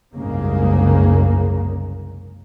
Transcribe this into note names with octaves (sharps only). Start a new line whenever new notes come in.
F#1 C2 G#2 C#3 A#3